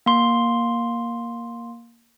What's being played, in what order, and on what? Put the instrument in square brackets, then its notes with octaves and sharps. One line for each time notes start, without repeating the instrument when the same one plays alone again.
[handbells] A#3 C6